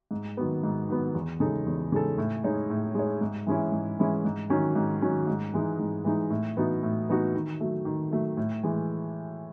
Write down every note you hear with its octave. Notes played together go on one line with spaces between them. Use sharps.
G#2
D#3 F#3 B3
G#2
D#3 F#3 B3
E2
C#3 G#3 D#4 A4
E2
C#3 G#3 D#4 A4
A2
G#3 D#4 G#4 C#5
A2
G#3 D#4 G#4 C#5
G#2
E3 G#3 C#4 E4
G#2
E3 G#3 C#4 E4
G#2
D#3 F#3 C#4
G#2
D#3 F#3 C#4
G#2
E3 G#3 D#4
G#2
E3 G#3 D#4
A2
E3 B3 D#4 F#4
A2
E3 B3 D#4 F#4
D#3
F#3 A3
D#3
F#3 A3
A2
E3 G#3